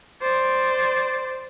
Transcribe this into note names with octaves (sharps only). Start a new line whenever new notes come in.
C5 D5